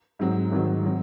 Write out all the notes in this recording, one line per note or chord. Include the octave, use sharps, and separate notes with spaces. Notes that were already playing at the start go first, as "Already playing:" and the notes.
G#2 F#3 C4
G#1 G#2 D#3 F#3 C4
F#3 C4